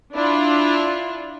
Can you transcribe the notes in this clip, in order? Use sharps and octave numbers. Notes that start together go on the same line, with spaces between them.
D4 E4 F4